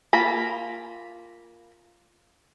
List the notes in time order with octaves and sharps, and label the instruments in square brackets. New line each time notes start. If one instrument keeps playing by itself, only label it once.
[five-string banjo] A#3 F4 A#5 B5